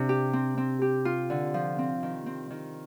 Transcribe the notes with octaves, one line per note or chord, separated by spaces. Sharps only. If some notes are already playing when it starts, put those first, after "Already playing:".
Already playing: C3 D4
G4
C4
C4
G4
F4
D3
F3
C4
D#3
C4
D#3